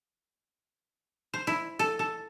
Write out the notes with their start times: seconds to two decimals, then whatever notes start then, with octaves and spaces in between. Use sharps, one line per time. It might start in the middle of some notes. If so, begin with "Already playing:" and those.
1.34 C5
1.47 E4
1.79 A4
1.99 A4